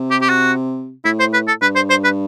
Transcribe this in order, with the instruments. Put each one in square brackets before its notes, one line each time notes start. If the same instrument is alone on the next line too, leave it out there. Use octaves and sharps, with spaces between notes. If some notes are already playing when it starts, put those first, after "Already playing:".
Already playing: [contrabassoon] C3
[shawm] G4
G4
F#4
[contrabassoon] A2 [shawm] E4
[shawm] C5
B4
A4
[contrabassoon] G2 [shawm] B4
[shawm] C5
C5
B4